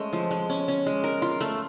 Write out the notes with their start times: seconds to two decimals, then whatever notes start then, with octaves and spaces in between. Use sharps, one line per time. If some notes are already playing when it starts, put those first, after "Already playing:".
Already playing: G#3 A3 C#4
0.13 F3
0.31 G#3
0.50 C#4
0.68 C#4
0.86 G#3
1.04 A#4
1.22 F4
1.40 A3